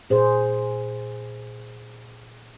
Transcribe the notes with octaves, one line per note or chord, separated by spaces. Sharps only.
A#2 G#4 C5